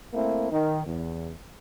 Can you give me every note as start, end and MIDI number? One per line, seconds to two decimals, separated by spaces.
0.14 0.50 57
0.14 0.50 58
0.14 0.50 60
0.14 0.50 64
0.52 0.81 51
0.87 1.32 40